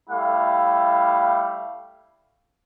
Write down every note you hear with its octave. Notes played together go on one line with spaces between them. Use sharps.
G3 A3 E4 F5